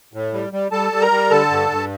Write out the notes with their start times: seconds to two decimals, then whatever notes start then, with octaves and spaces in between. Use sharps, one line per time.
0.14 A2
0.34 G3
0.53 G3
0.72 G3 A4 A5
0.92 G3
1.01 A#4 A#5
1.11 G3
1.30 D3 A4 A5
1.51 G2
1.70 G2